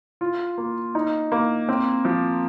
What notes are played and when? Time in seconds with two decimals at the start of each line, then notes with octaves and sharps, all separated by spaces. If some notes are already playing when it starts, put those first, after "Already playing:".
0.21 F4
0.58 A#3
0.95 D#4
1.32 A#3
1.69 C4
2.05 F3